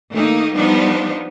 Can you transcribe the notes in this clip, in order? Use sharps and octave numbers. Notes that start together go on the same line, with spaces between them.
D#3 A3 A#3 D#4
F3 G3 B3 D4 D#4